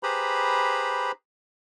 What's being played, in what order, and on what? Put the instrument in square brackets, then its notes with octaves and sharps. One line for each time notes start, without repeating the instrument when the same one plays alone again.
[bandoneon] G4 G#4 B4 C5 A#5 B5